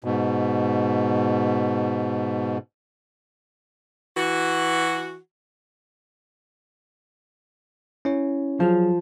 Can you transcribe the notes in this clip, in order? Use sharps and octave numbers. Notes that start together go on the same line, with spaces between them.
G#2 B2
E3 F#4
C#4 E4 C#5
F3 F#3 G#4